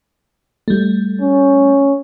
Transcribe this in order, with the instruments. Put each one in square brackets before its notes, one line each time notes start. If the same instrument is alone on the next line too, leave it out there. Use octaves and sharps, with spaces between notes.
[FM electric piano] G3 A3
[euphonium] C#4